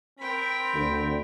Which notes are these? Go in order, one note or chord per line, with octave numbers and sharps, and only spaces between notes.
C4 A#4 G5 B5
D2 D3